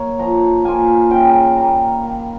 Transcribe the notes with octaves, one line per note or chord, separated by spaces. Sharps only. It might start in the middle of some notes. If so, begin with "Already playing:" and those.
Already playing: A#3 C#5
F3 A#5
A#3 F4 G#5
C#3 G5
G#5
G5
G3 A#3 A#5
D#3